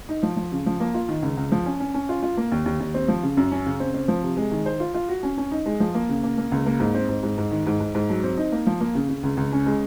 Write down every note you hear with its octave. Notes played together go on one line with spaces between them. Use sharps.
D#4
F3
F3
C#3
F3
A#3
F4
D#3
C#2
C#2
F3
C#4
C#4
C#4
F4
F4
A#3
D#2
D#2
D#2
C4
F3
C#3
F#2
C#4
C#3
C4
C4
F3
C3
G#3
D#3
C5
F4
F4
F#4
C#4
C#4
D#4
G#3
F3
A#3
C#3
A#3
A#3
C#2
A#3
G#2
C4
G#2
G#2
G#2
D#3
G#2
G#2
G#2
F#3
C4
D#4
A#3
F3
A#3
C#3
C#3
C#2
C#2
C#4
G#3